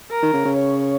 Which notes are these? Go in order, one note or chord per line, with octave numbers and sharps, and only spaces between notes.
A#4
D#3
C#3
C#3
C#5